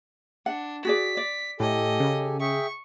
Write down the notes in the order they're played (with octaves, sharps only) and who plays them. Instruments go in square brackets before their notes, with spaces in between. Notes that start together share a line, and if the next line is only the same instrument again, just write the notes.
[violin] D4 [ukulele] F#5
[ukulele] F#4 G#4 D5 [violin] B6
[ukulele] D5
[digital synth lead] A2 [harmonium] G4 A4 G#5 [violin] D#5
[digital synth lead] C#3
[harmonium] G#4 E5 G5 [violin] C#6